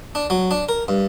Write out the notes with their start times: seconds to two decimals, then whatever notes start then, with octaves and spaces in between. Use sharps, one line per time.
0.15 D4
0.30 F#3
0.51 D4
0.69 A#4
0.88 G2